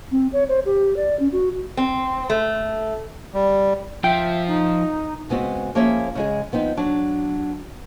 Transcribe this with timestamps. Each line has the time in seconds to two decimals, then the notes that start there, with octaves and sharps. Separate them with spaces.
0.11 C4
0.33 C#5
0.49 C5
0.65 G4
0.96 D5
1.19 C#4
1.32 F#4
1.77 C4
2.30 A3
3.34 G3
4.04 F3 E5 G5
4.48 D#4
5.29 C#3 G#3 B3 C4 F#4
5.75 F3 A#3 C#4 G#4 C#5 E5
6.15 C#3 G#3 G#4
6.52 F3 B3 C4 D#4
6.77 F#3 D4